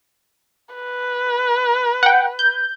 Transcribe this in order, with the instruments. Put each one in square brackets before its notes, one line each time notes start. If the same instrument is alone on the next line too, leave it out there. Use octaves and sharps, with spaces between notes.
[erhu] B4
[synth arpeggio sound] F#5 G5
G6